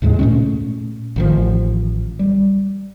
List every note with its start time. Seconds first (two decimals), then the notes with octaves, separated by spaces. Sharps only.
0.02 D#2 A2 C#3 G#3
0.19 A#2 A3 C#4
1.16 A1 D#3 F3
2.19 G3